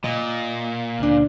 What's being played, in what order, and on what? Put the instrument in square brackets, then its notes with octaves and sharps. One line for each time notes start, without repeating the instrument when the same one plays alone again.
[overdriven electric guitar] A#2 [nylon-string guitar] D#5
[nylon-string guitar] D2 D4